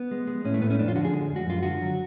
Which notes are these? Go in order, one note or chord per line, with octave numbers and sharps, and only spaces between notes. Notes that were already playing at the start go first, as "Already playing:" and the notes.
Already playing: B3
G#3
G#3
A2 C#4
A3
A2 B3
C#4
F2 D4
F4
D3 F#4
G#4
G#3
F2
F#4
F#2 F4
D3 F#4
F#3